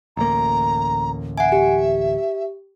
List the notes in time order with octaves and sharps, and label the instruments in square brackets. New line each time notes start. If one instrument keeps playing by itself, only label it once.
[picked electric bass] A1 D2 A#3 [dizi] A#5
[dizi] E5 [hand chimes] F#5 G#5
[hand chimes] G4